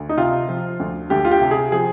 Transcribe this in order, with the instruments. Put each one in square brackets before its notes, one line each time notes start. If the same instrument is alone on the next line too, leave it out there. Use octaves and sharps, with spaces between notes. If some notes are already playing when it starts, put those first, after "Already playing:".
Already playing: [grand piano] D2
D#4
C3 F4
F3
D2
D2 G4
F4
G4
C3
G#4
F3 G#4